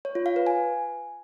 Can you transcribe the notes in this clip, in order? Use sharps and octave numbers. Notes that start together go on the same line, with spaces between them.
C#5
F4
F5
B4
G#5